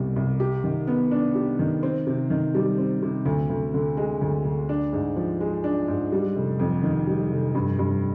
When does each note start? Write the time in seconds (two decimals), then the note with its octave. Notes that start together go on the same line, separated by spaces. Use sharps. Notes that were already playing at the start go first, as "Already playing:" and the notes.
Already playing: C2 B2 G3
0.16 C2
0.40 G4
0.64 D#3
0.87 B3
1.11 D4
1.35 G4
1.59 D#3
1.83 C4
2.07 C3
2.30 D#3
2.55 G3
2.78 C4
3.02 C3
3.26 D2
3.50 D2
3.74 D3
3.97 G#3
4.21 D2
4.45 D2
4.69 D4
4.93 G#2
5.16 F3
5.41 G#3
5.64 D4
5.88 G#2
6.12 G3
6.36 F1
6.59 F2
6.83 D#3
7.07 G3
7.32 F1
7.55 G2
7.79 G2